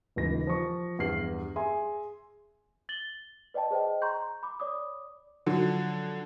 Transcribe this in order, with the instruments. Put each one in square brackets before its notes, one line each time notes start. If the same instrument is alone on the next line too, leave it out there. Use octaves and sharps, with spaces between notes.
[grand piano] D#1 C#2 E3 D#4 A#6
F3 C#6
E2 G2 F6 C7 F#7
G#4 E5 G#5 C6
[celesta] A6 F#7 G7
B4 D5 D#5 G5 A5
G#4 C5 D#5 G5
A#5 C6 C#6 G6
B5 D6
C#5 D5 D6 D#6
[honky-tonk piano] D3 F3 F#3